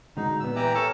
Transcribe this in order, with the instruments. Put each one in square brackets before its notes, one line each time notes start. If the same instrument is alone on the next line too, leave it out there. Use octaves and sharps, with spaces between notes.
[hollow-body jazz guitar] D3 G#3 F#4 [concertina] D#4
[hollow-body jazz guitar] A#2 B3 [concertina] E6
[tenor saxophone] E3 [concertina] G4 A#5 D6
[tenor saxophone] A4 [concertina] A#4 C#5 [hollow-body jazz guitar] G5